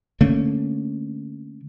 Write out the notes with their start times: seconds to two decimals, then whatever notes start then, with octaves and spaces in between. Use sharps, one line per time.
0.21 D3 A3 A#3 C#4